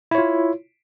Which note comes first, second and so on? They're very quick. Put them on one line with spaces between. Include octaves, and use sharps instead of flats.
E4 C#5 F4